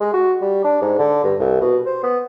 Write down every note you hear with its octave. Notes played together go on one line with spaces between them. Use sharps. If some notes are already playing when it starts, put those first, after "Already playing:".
G#3
F#4
G3
D4
G#2
D3
G2
C2
B2
C5
B3